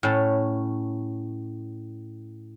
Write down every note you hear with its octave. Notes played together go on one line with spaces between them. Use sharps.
A2 C#4 A5